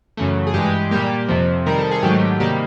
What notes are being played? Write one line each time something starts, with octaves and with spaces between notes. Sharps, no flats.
F#2 C#3 E3 A3
G#4
G2 E3 G#3 G4
A#2 G3 A#3 G4
F2 C3 F3
C3 D#3 G3 A#4
A4
G#4
G#2 D#3 F#3 A3 G4
C3 D#3 G3 A#3 G4